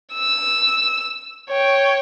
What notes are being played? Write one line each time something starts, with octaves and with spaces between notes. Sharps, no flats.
E6
C#5 G5